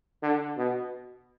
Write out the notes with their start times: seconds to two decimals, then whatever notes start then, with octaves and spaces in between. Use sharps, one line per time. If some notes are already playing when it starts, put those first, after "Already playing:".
0.23 D3
0.57 B2